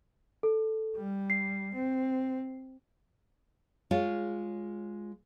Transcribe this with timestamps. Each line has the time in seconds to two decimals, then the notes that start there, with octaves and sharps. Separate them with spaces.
0.43 A4
0.96 G3
1.30 C7
1.73 C4
3.91 G#3 F4 C#5